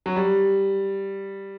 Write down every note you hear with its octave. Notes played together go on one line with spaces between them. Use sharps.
F#3
G3